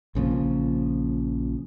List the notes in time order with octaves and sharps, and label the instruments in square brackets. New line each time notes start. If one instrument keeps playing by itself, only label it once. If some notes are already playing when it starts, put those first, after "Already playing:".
[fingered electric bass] A#1 C#3 F3 A#3